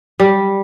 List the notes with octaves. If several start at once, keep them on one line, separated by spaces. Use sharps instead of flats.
G3